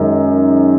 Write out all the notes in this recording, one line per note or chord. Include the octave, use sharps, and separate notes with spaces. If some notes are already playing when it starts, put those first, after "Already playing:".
Already playing: F#2 D#3 G#3